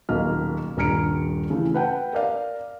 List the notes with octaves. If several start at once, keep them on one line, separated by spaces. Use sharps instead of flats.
D#1 B1 A#3 F6
D#1 G2 A#5 F6 C#7 D7
C#3 E3 A3
B4 F#5 G5 A5
A#4 D5 F5